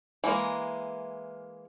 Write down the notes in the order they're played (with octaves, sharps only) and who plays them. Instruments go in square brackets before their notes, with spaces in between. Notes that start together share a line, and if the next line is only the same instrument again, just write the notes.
[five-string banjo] E3 G#3 A#3 A#4